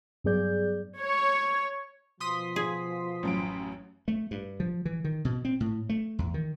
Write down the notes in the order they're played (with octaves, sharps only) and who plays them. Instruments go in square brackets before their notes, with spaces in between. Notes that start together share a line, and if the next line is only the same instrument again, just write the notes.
[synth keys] G2 F#3 B3 G#4 D5 G6
[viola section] C#5
[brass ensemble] B2 F3 [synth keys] C6 D#6 B6
[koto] G#4
[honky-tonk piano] A1 F#2 D7
[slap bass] A3
G2
F3
E3
D#3
B2
C4
A2
A3
E2
D#3